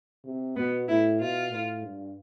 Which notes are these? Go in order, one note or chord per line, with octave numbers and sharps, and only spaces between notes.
C3
B2 B3
A2 E4
B2 F4
A2
G2